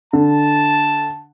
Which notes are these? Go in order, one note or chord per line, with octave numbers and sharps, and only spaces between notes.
D3 A5